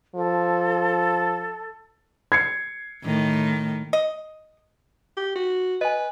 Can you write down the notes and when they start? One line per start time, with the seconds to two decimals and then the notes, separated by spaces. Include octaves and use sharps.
0.15 F3 A4
2.32 G#6 C7 C#7
3.03 A2 D#3
3.93 D#5
5.17 G4
5.35 F#4
5.81 B4 D#5 G#5